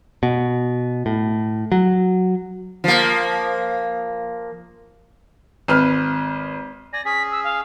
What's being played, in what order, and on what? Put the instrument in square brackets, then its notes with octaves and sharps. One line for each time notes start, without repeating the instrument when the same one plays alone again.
[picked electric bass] B2
A2
F#3
[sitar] F3 A#3
[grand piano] G#1 B4 F6
[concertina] D5 G#5 [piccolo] A#6
[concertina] C#4 G#4 [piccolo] B6
[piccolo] E6
F5